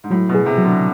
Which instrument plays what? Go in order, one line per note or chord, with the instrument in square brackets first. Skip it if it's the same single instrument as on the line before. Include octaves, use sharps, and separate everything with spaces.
[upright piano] G#2
[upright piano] A2 [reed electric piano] F#3
[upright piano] B2
[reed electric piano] G#4
[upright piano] C3
[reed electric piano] F#3
[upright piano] D3